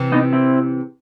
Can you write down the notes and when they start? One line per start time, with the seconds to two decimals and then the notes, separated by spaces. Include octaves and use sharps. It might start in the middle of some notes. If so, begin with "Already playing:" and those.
Already playing: C3 E3
0.12 B3 D#4
0.33 C4 E4